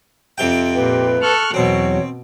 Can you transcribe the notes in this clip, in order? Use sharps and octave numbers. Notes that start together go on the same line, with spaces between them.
F2 C3 G5
A#2 G4 B4
A4 C#6 F6 F#6
E2 B2 F#3 C4 C#5